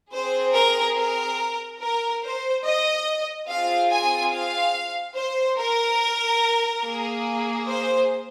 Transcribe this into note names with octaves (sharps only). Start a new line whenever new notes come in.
C4 G#4 C5
A#4
A#4
A#4
C5
D#5
C4 F4 G#4 F5
G#5
F5
C5
A#4
A#3 G#4
C5